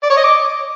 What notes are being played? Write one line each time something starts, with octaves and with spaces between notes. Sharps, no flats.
D5
C#5
D#5
D6